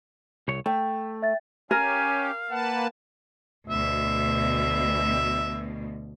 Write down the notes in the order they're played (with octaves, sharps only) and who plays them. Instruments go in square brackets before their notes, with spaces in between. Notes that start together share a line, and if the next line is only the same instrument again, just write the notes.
[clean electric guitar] C2 C#5
[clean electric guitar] A3 [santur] G5
[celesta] E5 A6
[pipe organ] C#4 G4 [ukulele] A#4 [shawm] F5 [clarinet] G#5
[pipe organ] A#3 B4 A5 [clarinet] F#5
[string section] D2 B2 [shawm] E5